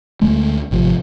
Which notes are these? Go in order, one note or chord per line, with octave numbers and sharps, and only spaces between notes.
D2 D3 G#3 A3
G#1 C3 F3